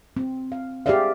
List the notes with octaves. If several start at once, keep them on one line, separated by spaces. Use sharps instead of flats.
C4
F5
G4 G#4 C5 D5 E5 F5